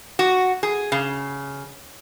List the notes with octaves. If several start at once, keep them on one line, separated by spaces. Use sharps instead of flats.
F#4
G#4
C#3